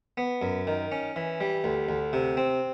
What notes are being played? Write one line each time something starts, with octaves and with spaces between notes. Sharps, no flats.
B3
F#2
D#3
C#4
E3
G3
D2
D2
C3
C4